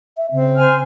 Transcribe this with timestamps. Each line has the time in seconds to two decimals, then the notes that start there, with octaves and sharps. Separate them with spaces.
0.17 E5
0.32 C#3 C4
0.56 C5 G#5 F6